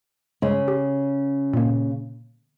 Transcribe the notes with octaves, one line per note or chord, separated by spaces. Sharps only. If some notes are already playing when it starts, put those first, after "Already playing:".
C#3 G#3
G4
A#2 A#3